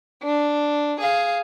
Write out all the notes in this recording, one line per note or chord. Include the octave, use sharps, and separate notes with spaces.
D4
G#4 F5